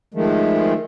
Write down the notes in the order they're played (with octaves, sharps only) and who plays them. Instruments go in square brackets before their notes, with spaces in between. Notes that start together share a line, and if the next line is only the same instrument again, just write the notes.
[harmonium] D#3 F3 G#3 A3